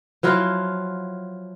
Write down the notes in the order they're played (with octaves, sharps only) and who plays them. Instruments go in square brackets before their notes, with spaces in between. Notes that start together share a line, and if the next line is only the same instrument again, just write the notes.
[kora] F3 F#3 E4 F4